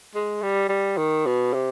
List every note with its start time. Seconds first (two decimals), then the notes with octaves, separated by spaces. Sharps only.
0.15 G#3
0.42 G3
0.69 G3
0.98 D#3
1.26 B2
1.53 C3